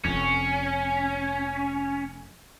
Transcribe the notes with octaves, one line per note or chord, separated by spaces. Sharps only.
F1 F2 C#4